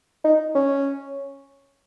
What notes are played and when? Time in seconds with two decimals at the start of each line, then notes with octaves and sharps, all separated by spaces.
0.24 D#4
0.55 C#4